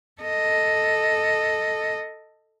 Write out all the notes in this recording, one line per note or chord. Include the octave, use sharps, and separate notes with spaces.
A4 D#5